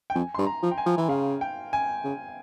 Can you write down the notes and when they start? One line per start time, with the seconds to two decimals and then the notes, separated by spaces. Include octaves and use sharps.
0.10 G5
0.15 F2 G#5
0.34 G2 C6
0.46 A#5
0.63 F3
0.71 G5
0.78 G#5
0.86 F3
0.98 E3
1.09 C#3 F5
1.41 G5
1.73 G#5
2.04 C#3